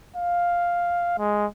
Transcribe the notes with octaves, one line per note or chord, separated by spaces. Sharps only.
F5
G#3